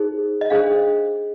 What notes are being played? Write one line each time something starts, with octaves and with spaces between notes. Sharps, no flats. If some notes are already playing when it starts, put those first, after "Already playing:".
Already playing: D#4 G#4 C5
D#5
D4 G#4 C5 F5